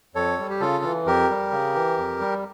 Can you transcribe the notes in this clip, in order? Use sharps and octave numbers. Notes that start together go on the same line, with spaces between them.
F2 A4 C#5
G3
G4
C#3 F4 A4
E3
F2 G4 A#4
G3
C#3
E3
F2
G3